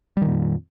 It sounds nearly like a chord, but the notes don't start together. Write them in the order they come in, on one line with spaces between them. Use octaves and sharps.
G3 D#3 A#2 F2